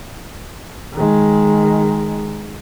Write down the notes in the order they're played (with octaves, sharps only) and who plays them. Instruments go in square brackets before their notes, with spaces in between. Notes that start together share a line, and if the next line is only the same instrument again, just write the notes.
[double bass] D#3 G#3